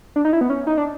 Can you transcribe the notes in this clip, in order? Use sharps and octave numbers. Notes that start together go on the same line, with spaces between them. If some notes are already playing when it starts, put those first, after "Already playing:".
D4
D#4
E4
B3
C#4
D#4
D4